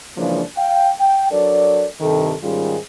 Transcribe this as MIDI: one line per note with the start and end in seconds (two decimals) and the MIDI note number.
0.18 0.43 49
0.18 0.43 52
0.18 0.43 53
0.18 0.43 56
0.18 0.43 58
0.18 0.43 62
0.58 0.90 77
0.58 0.90 79
0.99 1.30 79
1.31 1.86 54
1.31 1.86 62
1.31 1.86 69
1.31 1.86 70
1.31 1.86 74
2.01 2.34 43
2.01 2.34 48
2.01 2.34 51
2.01 2.34 69
2.43 2.78 44
2.43 2.78 51
2.43 2.78 55
2.43 2.78 61
2.43 2.78 65
2.43 2.78 68